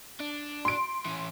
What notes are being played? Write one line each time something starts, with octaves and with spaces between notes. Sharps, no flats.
D4
C6 D7
E3 C#4